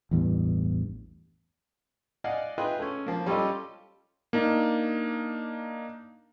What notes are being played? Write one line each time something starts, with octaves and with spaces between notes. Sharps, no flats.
A1 E2 G2
D5 D#5 F5 F#5 G#5
F4 G#4 B4 D#5 E5 G5
A3 C#4
F3 A#3
G3 C#4 F4 G4 A4 D#5
A#3 D4 D#4